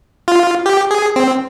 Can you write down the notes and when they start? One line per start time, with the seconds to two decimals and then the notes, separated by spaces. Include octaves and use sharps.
0.28 F4
0.66 G4
0.91 G#4
1.16 C4